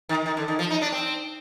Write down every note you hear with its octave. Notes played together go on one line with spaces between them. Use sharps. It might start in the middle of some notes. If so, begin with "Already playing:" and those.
D#3
D#3
D3
D#3
F3
D#4
D4
C4